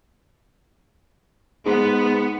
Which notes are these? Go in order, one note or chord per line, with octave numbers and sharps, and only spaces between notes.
G#2 B3